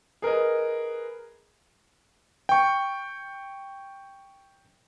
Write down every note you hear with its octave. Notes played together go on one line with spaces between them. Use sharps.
G#4 A#4 B4 D#5
G5 C#6